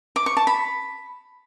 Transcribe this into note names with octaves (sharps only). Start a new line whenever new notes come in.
D6
C#6
A5
B5